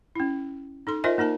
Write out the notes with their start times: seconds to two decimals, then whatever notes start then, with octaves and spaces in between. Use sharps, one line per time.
0.16 C#4 E4
0.87 D#4 A4 C6
1.04 F4 A#4 C5 D#5 E5 G#5
1.18 A#3 D#4 A#4 A5